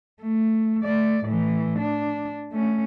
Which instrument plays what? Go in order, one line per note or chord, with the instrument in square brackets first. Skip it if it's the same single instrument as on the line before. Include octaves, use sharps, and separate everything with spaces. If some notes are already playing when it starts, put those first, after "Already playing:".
[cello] A3
A3 D5
A2 E3
D4
A3 C#4